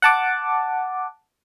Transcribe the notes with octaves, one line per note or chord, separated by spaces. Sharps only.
F#5 A5 D6